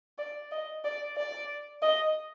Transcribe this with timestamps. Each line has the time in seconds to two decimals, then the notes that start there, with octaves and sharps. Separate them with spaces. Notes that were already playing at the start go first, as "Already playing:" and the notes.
0.18 D5
0.52 D#5
0.85 D5
1.16 D5
1.82 D#5